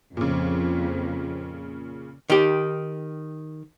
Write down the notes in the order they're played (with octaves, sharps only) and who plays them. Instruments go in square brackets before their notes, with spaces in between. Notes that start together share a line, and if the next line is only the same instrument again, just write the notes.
[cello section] F2 [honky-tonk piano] A#2 C#3
[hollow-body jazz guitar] D#3 G4